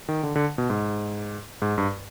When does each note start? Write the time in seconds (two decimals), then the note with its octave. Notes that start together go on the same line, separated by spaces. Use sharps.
0.09 D#3
0.23 D3
0.36 D3
0.58 B2
0.70 G#2
1.62 G#2
1.78 G2